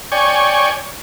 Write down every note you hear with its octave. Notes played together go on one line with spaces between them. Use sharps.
C#5 D5 G5 G#5 C#6